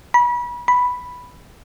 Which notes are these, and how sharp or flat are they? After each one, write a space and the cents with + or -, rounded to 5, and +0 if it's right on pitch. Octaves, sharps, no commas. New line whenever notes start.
B5 -35
B5 +0